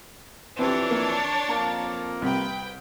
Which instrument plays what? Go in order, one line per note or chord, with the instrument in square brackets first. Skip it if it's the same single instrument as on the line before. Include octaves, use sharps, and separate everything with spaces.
[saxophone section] F2 E3 [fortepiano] C4 G4 [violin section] D4 C#5 A6
[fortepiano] A#3
[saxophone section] F2 A#3 [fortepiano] A5
[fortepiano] C2 C3 [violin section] B4 G5